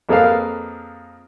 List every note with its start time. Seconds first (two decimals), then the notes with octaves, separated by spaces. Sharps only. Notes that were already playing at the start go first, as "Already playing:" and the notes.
0.09 F2 A#3 G#4 A4 B4 F5